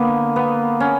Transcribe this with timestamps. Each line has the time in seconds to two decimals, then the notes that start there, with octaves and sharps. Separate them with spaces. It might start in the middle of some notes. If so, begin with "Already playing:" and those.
Already playing: D3 A#3 B3
0.36 B3
0.80 C#4